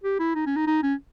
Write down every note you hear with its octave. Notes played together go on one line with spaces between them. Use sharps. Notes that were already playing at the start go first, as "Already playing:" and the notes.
G4
E4
D#4
C#4
D#4
D#4
C#4